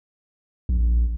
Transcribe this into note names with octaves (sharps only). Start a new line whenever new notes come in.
A#1